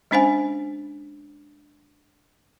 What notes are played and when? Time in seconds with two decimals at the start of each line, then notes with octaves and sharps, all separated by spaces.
0.11 G#3 C#4 D4 C5 F5 G#5